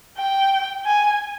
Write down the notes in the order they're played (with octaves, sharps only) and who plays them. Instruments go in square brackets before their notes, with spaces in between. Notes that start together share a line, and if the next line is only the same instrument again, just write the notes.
[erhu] G5
G#5